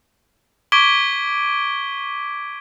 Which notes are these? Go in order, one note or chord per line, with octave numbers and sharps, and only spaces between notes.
C#6 D6 G#6 B6 D7 G7